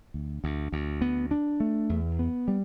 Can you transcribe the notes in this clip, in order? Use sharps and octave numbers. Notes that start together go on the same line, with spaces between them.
D2
D2
D2
B3
D4
A3
E2
B3
G3